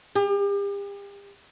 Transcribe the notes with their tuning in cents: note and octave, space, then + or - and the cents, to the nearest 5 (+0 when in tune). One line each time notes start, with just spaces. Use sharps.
G4 +40